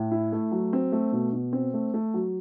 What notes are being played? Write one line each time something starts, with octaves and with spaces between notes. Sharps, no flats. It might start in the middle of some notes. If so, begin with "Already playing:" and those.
Already playing: A2
E4
A3
F#3
C4
A3
B2
B2
C4
A3
A3
F#3